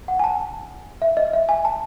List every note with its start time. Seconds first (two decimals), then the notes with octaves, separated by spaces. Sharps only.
0.08 F#5
0.19 G#5
0.24 A5
1.02 E5
1.17 D#5
1.33 E5
1.49 G#5
1.65 A5